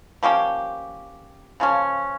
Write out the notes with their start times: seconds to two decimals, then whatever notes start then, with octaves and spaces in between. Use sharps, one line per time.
0.23 F3 A#3 C#4 G4
1.60 C#3 F3 A#3 C#4